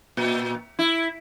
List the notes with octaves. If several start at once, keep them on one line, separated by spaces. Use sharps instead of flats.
A#2
E4